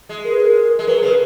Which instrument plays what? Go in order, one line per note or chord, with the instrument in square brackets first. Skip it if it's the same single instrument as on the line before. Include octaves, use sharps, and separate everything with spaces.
[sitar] G#3
[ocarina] A#4
B4
A#4
[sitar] G#3
[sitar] F#3 [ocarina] B4
[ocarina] A#4
[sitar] C#3 [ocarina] B4